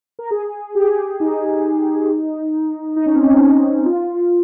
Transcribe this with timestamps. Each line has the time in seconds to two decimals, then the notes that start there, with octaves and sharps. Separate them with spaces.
0.19 A#4
0.31 G#4
0.75 G4
0.83 G#4
0.89 G4
1.20 D#4
2.96 D#4
3.06 C#4
3.15 C4
3.24 C#4
3.42 D#4
3.85 F4